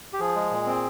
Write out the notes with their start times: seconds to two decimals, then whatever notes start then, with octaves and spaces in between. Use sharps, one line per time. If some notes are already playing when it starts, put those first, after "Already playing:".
0.13 G4
0.20 F3 G#4
0.35 G#3
0.51 A#2
0.66 C4